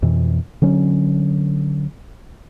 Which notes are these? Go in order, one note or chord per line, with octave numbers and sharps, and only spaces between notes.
F2 B2 E3
D3 F#3 C#4